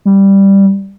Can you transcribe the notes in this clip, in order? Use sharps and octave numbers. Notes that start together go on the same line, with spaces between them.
G3